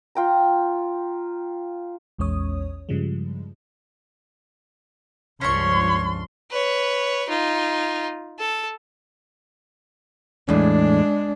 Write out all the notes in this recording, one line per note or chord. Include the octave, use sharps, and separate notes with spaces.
F4 G5 A#5
A#1 E2 G#3 C#4 C#5 D#6
G2 C#3 F3 G3 G#3
C#2 G2 F3 C#4 D4 C#5 C6 C#6
B4 C#5
D#4 F4
A4
E2 A2 G#3 D4